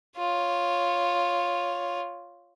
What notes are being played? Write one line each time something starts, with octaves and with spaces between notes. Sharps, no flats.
F4 C#5